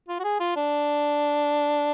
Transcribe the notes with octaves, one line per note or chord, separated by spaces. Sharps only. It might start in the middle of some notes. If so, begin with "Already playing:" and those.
F4
F#4
G#4
F4
D4